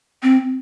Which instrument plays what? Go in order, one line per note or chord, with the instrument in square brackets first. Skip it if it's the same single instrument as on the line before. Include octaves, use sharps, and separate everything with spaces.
[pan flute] C4